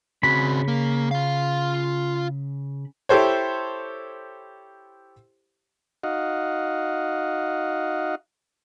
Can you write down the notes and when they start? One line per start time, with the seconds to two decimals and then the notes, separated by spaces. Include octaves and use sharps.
0.23 C#3 C4 F#4 B5
0.68 A#3
1.11 F4 F5
3.09 E4 G4 A4 C5 C#5
6.04 D#4 F#4 D#5 F5 F#5